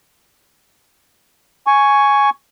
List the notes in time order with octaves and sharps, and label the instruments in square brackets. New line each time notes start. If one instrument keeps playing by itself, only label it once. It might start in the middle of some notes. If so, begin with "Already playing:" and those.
[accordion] G#5 C#6